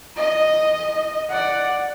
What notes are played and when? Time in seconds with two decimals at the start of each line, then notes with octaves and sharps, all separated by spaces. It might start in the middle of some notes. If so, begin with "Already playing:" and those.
0.16 D#5
1.29 D5 F#5